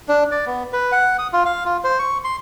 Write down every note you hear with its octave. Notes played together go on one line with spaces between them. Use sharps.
D4
D5
B3
B4
F#5
D#6
F4
F5
F4
C5
C#6
C6